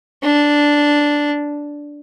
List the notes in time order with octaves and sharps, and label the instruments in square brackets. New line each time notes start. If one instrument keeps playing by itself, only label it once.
[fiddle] D4